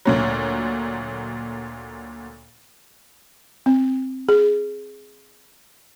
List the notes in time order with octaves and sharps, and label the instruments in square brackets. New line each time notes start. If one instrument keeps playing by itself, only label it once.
[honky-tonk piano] D2 A#2 F#3
[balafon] C4
G#4